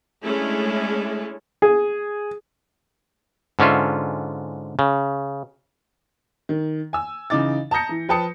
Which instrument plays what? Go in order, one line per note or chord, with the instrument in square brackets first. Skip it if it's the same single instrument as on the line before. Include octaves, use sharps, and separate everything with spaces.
[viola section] G#3 A3 C#4 D4 E4 G#4
[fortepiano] G#4
[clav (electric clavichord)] G#2 D3 C#4 F4 E5
C#3
[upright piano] D#3
G#5 E6
C#3 E3 D#4 D6 A6
A5 A#5 D#6 G6 A#6 C#7
E3
F3 B4 G5 A5 D#6 C#7